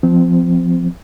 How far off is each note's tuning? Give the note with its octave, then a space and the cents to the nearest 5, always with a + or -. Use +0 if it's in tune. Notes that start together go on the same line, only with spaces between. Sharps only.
F3 +0 C4 -25